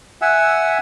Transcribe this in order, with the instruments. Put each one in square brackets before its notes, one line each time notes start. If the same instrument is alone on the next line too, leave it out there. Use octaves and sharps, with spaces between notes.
[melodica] E5 F#5 G#5 E6